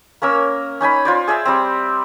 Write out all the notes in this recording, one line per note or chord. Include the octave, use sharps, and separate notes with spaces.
A#3 C#4 A#4 E6
C#4 D#4 G#5 B5
F4 C5 D5
G#4 D5 E5 E6
G3 C4